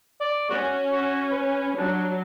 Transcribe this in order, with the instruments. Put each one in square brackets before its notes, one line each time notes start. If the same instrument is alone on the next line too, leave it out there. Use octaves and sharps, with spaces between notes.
[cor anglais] D5
[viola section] C#4 [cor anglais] F#4
[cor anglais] F#4
B4
[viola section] F#3 [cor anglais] D4